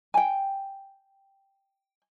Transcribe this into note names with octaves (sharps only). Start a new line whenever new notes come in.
G5 G#5